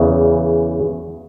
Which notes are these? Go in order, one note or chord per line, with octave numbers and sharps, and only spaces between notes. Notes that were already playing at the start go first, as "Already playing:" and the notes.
Already playing: E2 C#3 E3